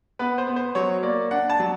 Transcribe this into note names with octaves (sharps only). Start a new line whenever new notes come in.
B3 B4
C5
B3
C5
F#3 C#5
A#3 D5
D4 F#5
A5
F#3